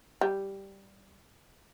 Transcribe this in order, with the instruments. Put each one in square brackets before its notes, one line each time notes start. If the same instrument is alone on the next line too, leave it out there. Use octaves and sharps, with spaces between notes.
[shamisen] G3